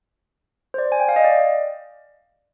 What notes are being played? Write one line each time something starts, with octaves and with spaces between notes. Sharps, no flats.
C5
D5
G#5
G5
F5
D#5
D5